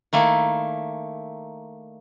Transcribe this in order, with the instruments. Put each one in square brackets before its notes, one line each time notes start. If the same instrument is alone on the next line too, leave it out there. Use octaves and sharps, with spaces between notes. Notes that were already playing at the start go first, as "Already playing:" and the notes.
[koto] D#3 A3 A#3 E4